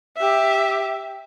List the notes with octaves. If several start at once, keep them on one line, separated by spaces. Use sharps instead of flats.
G4 E5